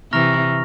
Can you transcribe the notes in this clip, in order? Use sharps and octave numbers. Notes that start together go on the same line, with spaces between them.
C3 E3 A#5 C#6 F6 A#6 F7